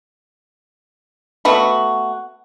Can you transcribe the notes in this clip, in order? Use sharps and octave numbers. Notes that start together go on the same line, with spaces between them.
A3 B3 F#4